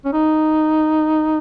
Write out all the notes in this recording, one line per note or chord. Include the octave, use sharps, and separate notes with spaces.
C#4
D#4